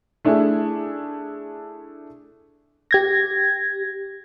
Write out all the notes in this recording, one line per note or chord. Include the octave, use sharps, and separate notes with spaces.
A3 D4 E4 G#4
G4 G#6 A#6